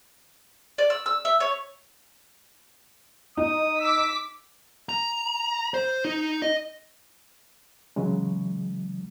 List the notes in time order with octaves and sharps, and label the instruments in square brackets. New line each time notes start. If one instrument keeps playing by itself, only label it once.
[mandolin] D5
E6
E6
E5
C#5
[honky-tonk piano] D#4 [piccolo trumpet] D#6
[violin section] D6 B6 [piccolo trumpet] E6
[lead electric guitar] A#5
C5
D#4
D#5
[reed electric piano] C#3 E3 F#3 G#3